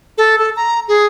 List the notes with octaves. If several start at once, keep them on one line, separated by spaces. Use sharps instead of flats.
A4
A4
A#5
G#4